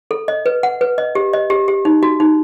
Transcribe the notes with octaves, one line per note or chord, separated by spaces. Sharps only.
A4
D#5
B4
F#5
B4
D#5
G4
D#5
G4
G4
D#4
F#4
D#4